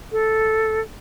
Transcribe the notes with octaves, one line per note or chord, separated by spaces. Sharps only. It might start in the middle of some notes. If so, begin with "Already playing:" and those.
A4